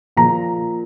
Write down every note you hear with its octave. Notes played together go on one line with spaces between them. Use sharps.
A#2 F3 A#5